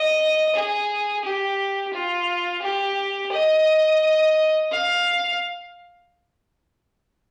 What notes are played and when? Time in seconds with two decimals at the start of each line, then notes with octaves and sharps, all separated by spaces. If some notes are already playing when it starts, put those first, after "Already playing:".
Already playing: D#5
0.56 G#4
1.24 G4
1.94 F4
2.63 G4
3.33 D#5
4.72 F5